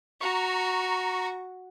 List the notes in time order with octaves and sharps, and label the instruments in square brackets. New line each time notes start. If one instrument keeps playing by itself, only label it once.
[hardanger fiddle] F#4 [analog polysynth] A#5 C#6